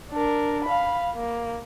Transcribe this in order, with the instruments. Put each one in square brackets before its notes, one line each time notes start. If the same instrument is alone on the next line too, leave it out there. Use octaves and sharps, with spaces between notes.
[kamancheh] D4 A#4
F5 B5
A#3